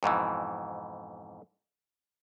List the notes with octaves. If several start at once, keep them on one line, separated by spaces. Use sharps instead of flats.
F2 G#2 B2 E3